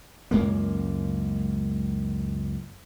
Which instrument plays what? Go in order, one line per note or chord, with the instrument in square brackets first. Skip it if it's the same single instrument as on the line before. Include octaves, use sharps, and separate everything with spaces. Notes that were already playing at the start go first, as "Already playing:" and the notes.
[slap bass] C#2 F#2 G#3 A#3